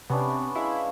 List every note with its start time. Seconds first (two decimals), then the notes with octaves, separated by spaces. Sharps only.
0.10 C3 B3 C#4 D4
0.55 G#3 E4 E5 F5